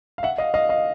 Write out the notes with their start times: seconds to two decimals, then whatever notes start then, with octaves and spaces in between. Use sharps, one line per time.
0.18 F5
0.23 E5 F#5
0.38 D#5 F5
0.54 D#5 F5
0.69 D#5 F5